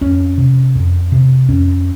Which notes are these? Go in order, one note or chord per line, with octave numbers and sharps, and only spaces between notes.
F2 C#4
C3
F2
C3
F2 C#4